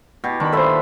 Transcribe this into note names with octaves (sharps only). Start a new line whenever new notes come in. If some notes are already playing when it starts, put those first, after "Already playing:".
B2 G4
D#3 D4 B5
A#2 A4 C5 E5 B5